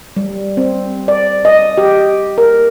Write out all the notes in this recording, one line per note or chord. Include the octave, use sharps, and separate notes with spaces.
G3
C4
D5
D#5
G4
A#4